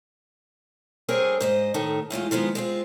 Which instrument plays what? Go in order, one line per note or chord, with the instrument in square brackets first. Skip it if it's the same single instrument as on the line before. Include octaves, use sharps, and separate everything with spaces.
[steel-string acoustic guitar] G2 C4 G#4 A#4 C#5 G#5
G#2 C5 D#5
A2 D#3 A3
E2 A2 G#3 F4
D#3 F3 G#3 B3
G#3 C4 F4